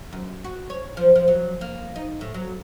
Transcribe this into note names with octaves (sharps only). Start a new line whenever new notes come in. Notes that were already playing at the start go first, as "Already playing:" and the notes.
F#2
F#4
C#5
F3
F3
F#3
A#3
D#4
A2
F#3